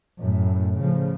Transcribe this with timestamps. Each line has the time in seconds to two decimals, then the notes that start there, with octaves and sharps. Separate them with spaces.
0.20 F#2 A2
0.81 A2 C#3 F3